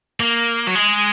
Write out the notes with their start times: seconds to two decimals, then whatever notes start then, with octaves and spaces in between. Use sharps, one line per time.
0.20 A#3
0.67 F#3
0.75 G#3